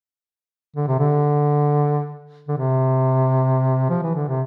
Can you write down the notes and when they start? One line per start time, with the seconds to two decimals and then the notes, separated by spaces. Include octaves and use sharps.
0.76 D3
0.88 C3
0.99 D3
2.48 D3
2.58 C3
3.90 F3
4.03 E3
4.15 D3
4.28 C3